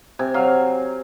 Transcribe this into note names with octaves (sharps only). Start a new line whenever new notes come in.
C3 G#5
F#3 F5